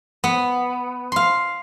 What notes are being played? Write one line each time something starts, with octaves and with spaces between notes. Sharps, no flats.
B3
F5 C6